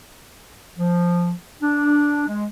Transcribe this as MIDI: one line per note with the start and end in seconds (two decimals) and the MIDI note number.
0.78 1.31 53
1.62 2.28 62
2.28 2.47 56